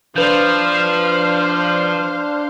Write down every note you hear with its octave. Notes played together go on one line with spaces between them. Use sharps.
F3 D4 B4 C5 F5 G6